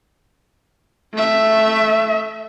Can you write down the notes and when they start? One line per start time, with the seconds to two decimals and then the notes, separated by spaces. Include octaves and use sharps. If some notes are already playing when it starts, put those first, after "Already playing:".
1.13 A3 E5